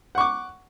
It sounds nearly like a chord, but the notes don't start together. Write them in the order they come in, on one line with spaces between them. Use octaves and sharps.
F#5 C#6 D6